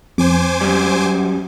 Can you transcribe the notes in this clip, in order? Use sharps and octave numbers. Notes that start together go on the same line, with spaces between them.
F2 C5 G#5 D6
F#2 G3